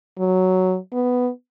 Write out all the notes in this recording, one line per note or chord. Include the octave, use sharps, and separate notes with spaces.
F#3
B3